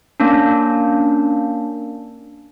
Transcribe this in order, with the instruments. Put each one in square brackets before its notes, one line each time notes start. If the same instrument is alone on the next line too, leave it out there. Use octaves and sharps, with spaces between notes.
[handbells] A#3 C#4 D4